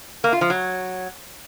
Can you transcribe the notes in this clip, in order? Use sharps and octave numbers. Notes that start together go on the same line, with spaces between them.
A#3
F4
F3
F#3